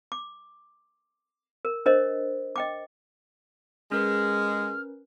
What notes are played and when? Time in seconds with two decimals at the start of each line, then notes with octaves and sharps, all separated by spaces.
0.12 D6
1.65 A#4
1.86 D4 A#4 C5 D#5
2.56 D#5 G5 D6
3.92 G#3 C#4 A#4 B4 F6